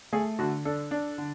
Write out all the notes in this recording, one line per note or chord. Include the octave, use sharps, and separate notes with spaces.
A3 G#4
D3 F#4
D4 A4
D4
D3